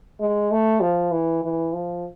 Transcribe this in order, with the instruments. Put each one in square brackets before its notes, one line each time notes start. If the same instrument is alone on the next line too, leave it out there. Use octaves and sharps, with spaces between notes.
[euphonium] G#3
A3
F3
E3
E3
F3